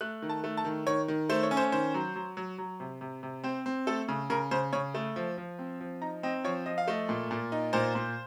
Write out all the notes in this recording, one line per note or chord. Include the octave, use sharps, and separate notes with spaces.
A3 F#6
D#3
A5
A3
A5
D#3
D#3 C#5
D#3
A3 C5
C#5
C#4
C5
D#3 C5
F#3
F#3
F#3
F#3
C3
C3
C3
C4 C5
C4
A3 A4
C#3
C#3 A#4
C#3 C5
C#3 C#5
A3
F3
F3
C4
F3
D#4 A#5
C4 D#5
F3 C#5
F3 D#5
F5
A3 D#5
A#2
A#2
D#4
A#2 C5
A#2